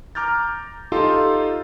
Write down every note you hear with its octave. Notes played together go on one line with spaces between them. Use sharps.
A#5 D6 F6 G6 A6
D#4 F4 G4 A4 C6